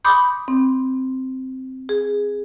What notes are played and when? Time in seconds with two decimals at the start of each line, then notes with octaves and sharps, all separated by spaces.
0.05 B5 C6 D6 D#6 G6
0.48 C4
1.89 G#4